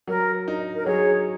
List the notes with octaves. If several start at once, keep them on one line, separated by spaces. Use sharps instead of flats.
F#3 A#4
D#4
A#4
F#3 G#4 C#5